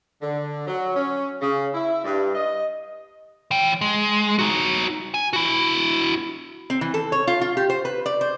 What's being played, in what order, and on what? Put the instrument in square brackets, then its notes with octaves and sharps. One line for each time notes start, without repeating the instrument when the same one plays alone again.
[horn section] D3
F#3
C#4
C#3
E4
G2
D#5
[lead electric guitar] E3 G5
G#3
D#4 F#4
G#5
E4 F#4
[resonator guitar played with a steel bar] C4
E3
A4
C#5
F4
F4
G4
C5
B4
D5
C5